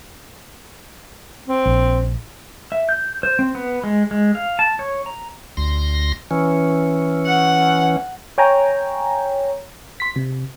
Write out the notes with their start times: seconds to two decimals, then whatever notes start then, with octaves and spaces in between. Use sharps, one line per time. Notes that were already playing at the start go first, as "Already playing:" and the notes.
1.48 C4
1.66 A#1
2.72 E5
2.89 G6
3.23 C5
3.39 C4
3.55 B3
3.84 G#3
4.11 G#3
4.35 F5
4.59 A5
4.79 C#5
5.06 A#5
5.57 D2 C6 A#6
6.31 E3 C#4
7.26 F#5
8.38 C#5 G5 G#5 A#5
10.00 C6 B6
10.16 C3